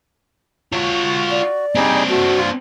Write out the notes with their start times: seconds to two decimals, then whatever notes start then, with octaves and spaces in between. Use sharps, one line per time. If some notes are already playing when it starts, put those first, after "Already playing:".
0.72 F4 F#4 C#5
1.31 D5
1.75 G3 C4 D4 D#4 G#4
2.09 A3 F#4
2.38 F4